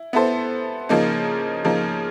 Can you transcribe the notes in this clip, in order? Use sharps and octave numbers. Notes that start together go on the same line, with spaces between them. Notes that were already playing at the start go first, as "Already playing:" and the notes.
Already playing: E4
B3 E4 A4 C5
C#3 F3 A#3 D#4
C#3 F3 A#3 D#4